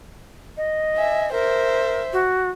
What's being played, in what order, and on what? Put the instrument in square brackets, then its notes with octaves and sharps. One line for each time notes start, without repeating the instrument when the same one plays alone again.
[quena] D#5
[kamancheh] E5 G#5
[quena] A#4 [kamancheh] C5 E5
[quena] F#4